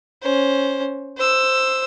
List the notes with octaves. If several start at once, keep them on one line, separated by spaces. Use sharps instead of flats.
C#4 C5
C5 E6